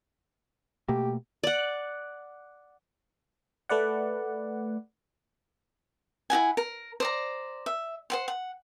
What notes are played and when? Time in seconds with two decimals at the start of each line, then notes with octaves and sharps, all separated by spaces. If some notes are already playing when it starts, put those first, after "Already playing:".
0.88 B2 A3 A#3 G4
1.43 D5 F#5
3.69 A3 B4 D5 F#5
6.30 E4 F#4 F#5 G#5
6.57 A#4
7.00 C5 D5 A#5
7.66 E5
8.10 C5 F#5 C6
8.28 F#5